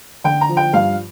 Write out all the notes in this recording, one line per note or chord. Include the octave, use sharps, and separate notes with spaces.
D3 G5
A#5
F3
G5
G2 F5